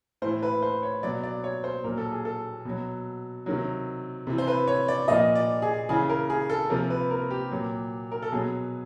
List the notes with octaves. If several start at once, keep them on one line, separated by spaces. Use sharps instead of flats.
A2 E3 C5
B4
C5
C#5
B2 F#3 D5
D5
C#5
C5
A#2 F#3 A#4
A4
G#4
A4
B2 F#3
C3 D#3 F#3
C3 E3
C5
B4
C#5
D5
A#2 F3 D#5
D5
G#4
C#3 E3 G#4
A#4
G#4
A4
C3 F3 A#4
B4
A#4
G4
A#2 F#3
A#4
A4
B2 F#3 G#4